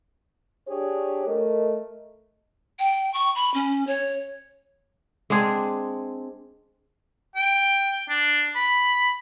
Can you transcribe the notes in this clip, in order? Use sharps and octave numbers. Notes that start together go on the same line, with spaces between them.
D4 G4 G#4 C#5
A3 A#4 D#5
G5
C#6
B5
C#4
C#5
G#3 C4 D4 G#4
G5
D4
B5